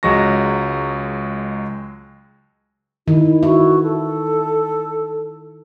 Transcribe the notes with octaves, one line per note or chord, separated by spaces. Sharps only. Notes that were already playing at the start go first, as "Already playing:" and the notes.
C#2 F#3 G#3 C#6 A#6
D#3 E4
E4 F#4
A4